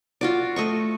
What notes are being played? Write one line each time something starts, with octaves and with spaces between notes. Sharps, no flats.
F4 F#4 D5
A3 D#5 C#6